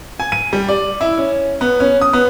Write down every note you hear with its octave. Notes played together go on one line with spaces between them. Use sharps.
G#5
D#7
G3
D5
E4
C#4
B3
C#4
D#6
B3